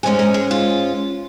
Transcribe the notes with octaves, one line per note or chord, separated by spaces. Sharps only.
G#2 G#3 C#4 G#5
A#4
G#4
F4